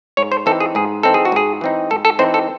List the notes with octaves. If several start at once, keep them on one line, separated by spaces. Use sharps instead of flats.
G#2 C#5
C5
E3 C4 D#4 A4
G#4
G#2 G#4
E3 C4 D#4 A4
G#4
F#4
G#2 G#4
E3 C4 D#4
G#2 A4
A4
E3 C4 D#4 C5
A4